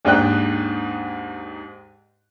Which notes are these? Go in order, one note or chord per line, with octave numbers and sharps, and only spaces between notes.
D#2 G#2 D4 D#4 G5 F#6